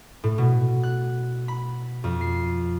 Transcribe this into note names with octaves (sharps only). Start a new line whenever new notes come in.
A2
B2
F#6
B5
F2
C7